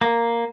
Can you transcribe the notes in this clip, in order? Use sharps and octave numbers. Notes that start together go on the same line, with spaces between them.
A#3